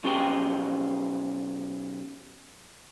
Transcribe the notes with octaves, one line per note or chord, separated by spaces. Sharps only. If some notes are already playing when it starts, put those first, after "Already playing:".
B1 C#4 G4 G#4 B4 G5